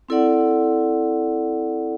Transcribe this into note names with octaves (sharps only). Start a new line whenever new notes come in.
C4 E4 A4 D5 F#5